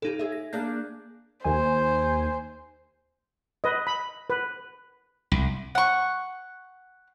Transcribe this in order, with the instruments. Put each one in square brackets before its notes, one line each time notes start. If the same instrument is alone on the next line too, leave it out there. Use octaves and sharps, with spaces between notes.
[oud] C#3 G4 [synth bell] D#4 A4
[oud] G#4 E5
[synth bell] A#6
[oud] A#3 D4 G#4 [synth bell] F#6 G6
[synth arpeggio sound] D#2 G#5 [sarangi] C5
[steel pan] B4 D#5
B5
B4
[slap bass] C2
[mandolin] F#5 C#6